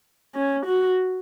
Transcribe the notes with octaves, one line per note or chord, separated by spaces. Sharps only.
C#4
F#4